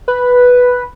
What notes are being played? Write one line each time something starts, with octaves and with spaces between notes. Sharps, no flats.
B4